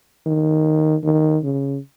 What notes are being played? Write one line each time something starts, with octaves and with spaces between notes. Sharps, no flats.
D#3
D#3
C#3